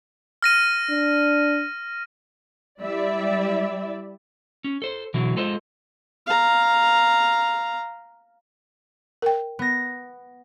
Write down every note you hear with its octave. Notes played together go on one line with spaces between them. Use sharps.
F6 A#6 D#7
D4
G3 E4 G4 D5 E5
C#4
A4 C5
B2 D3 E3 F#3
G#3 F4 A4 C5 D#5
F5 A#5
A#4 G5
B3 A#6